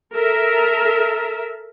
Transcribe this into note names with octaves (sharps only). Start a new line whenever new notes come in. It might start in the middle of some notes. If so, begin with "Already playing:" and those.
A4 A#4 E5